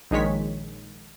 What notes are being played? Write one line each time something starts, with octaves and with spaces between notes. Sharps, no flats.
A#1 D#3 G#3 C#5 B6